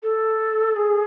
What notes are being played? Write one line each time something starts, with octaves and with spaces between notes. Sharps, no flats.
A4
G#4